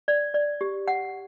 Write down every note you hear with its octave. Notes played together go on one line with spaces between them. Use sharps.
D5
D5
G4
F#5